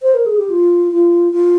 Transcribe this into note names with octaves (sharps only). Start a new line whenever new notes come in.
C5
A#4
G#4
G4
F4
F4
F4